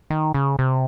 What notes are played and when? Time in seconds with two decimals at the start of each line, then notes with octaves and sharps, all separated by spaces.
0.10 D#3
0.34 C#3
0.59 C3